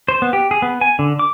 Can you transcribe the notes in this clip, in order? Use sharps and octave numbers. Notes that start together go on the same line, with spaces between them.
C5
B3
G4
G#4
B3
G#5
D3
D6